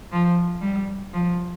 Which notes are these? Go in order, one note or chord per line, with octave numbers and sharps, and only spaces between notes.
F3
G3
F3